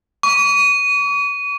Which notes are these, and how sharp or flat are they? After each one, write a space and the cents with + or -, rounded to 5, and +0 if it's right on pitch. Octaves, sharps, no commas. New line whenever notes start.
C#6 +40